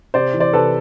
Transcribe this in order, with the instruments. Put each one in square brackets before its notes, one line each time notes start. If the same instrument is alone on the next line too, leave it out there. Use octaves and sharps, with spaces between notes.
[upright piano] C3 C5 D5
E3
C5 D5
C3 A4 B4